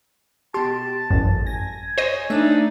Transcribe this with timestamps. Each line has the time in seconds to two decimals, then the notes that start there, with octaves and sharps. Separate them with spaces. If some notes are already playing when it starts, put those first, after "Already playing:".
0.54 B2 G4 A5 C6
1.11 A1 F#2
1.47 G#5 A#6
1.98 C5 C#5 D#5
2.30 A3 D4 D#4 E5